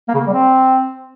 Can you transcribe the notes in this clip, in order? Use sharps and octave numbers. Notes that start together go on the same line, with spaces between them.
A#3
C#3
A#3
G3
C4